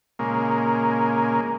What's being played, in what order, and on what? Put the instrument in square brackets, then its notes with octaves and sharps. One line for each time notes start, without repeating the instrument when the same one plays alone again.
[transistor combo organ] A#2 C#3 G#3 A#3